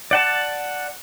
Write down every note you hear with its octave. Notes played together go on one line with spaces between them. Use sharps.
D5 F#5 A5